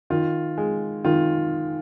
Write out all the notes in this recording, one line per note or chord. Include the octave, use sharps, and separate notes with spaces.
D#3 F4
G#3
D#3 F4